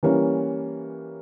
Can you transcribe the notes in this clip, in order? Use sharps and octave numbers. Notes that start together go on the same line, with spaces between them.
E3 G3 A#3 C#4